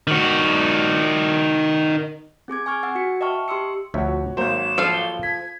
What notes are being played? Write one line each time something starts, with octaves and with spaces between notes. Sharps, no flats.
D#3 F#4
C4 G#4 D6 G#6
G#5 C#6 F6 G#6
F#5 E6 A6
F#4 C#7
D#5 E5 G5 A5 C#6 F6
G4 C6 D#6 E6 C#7
D2 F3 F#4 C#5 E5
G#1 F#3 A#3 C5 E7
F3 A4 F5
G7
G#6 B6